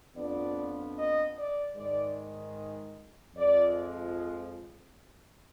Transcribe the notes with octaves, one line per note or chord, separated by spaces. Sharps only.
F2 F3 B3 D4 D5
D#5
D5
G#2 D#3 G#3 D5
F2 F3 G#3 D5